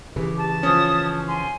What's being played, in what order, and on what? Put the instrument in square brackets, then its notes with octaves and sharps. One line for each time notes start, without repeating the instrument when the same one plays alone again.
[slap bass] C#3 E3 [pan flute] G4
[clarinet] A5
[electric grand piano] F3 C#4 [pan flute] D#6
[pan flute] G#5 [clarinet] C6